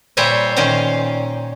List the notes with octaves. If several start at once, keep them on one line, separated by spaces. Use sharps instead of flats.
A#2 G3 C5 C#5 E5 G#5
A#2 D#3 C#4 C5 F5